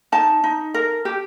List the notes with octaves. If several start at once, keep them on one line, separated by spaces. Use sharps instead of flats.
D#4 A5
D#4
A#4
G4